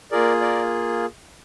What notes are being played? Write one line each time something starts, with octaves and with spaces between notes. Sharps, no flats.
A#3 F4 G#4 A#4 D5
A#4 D5